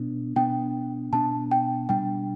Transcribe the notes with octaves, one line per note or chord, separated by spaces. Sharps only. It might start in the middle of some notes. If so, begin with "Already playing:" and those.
Already playing: B2 B3 D4
B2 B3 D4 G5
B2 B3 D4 A5
G5
B2 G3 D4 G5